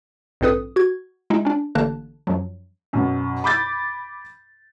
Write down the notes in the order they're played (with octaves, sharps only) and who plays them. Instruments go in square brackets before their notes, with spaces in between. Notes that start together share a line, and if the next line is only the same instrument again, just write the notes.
[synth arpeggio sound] A#1 G#2 C4 A4 B4 D#6
F#4 G#6
G#3 D#4 E4
C#4 D4
A1 D3 A#3 A5 F#6
F#2 F3 F#3
[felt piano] F#2 B2
B5 D6 G6 A6